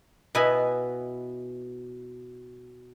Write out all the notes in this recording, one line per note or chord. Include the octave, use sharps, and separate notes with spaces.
B2 B3 E4 D#5 G#5 B5